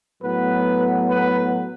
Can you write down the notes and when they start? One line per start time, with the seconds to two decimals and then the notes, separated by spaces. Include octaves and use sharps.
0.22 A2 F#3 B3 B4
1.08 B4